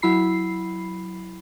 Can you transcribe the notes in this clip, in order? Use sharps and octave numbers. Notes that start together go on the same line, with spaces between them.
F#3 E4 B5 C7